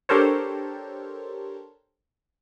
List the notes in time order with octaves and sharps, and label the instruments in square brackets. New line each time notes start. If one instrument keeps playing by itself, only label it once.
[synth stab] D4 G4 A4 A#4 C5 C#5